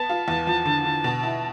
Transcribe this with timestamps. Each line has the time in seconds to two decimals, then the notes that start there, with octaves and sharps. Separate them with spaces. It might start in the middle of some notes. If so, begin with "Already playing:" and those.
Already playing: B3 A5
0.09 F4
0.28 E2
0.47 F3
0.65 D3
0.85 D3
1.04 B2
1.23 E4